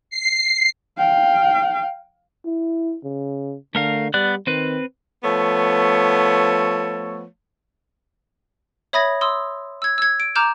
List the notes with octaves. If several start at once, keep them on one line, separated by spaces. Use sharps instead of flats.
C7
F5 G5
E4
C#3
D3 A3 A#4 F5
G3 B3 D5 F#6
D#3 C4 B4
F3 A3 B3 C#5
C#5 E5 B5 D#6 G#6 A#6
C6 D#6 E6
E6 G#6
E6 G#6
D7
A#5 D6 F6 G6 E7